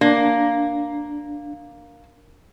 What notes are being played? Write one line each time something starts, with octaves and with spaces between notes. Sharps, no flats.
A#3 D4